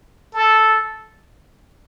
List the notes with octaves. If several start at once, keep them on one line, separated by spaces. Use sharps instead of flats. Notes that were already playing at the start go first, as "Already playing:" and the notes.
A4